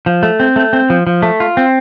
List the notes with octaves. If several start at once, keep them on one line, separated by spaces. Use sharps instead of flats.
F3
A3
C4
A3
C4
F3
F3
A3
F4
C4